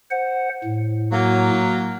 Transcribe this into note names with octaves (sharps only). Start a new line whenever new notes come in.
C5 F#5
A2
F#3 A#3